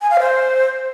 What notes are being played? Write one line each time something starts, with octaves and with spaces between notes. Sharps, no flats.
G#5
F5
C5